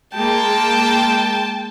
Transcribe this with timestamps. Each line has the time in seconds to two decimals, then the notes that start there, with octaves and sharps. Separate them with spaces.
0.14 G#3 A#3 G5 A5